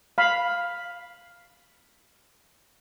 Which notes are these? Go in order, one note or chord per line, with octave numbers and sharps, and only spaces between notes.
F5 B5